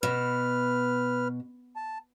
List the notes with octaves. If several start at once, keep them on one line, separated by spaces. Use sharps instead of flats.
B2 B4 F6
A5